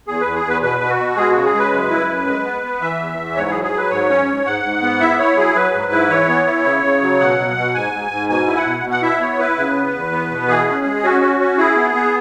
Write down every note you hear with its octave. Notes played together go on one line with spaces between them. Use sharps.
E2 G#4
E2 B4
G#4
E2 B4
B2 B4
B2
F#4
B2
G#3 G#4
C#3 F#4
G#4
G#3 B4
F#2
E4
F#2
G#3
B3
B3
E3 E5
E2
E3
G#2 C#5
G#4
F#3
G#4
F#3 B4
G#2 C#5
C#4
G#2
G#2 F#5
G#2
B3
E4 E5
E4 C#5
F#3 G#4
F#3 B4
G#2
E4
E3 C#5
B3
E4
C#3
C#3
F#3
B2 F#5
B2
B2
G#2 G#5
G#2
G#2
B2 G#5
E4
F#5
B2
B2
F#5
E4 E5
B3 C#5
E4 B4
C#3
B3
E2
B3
B2
E3 G#4
C#4
G#3
C#4 F#4
C#4
C#4
E4 G#4
B3
B3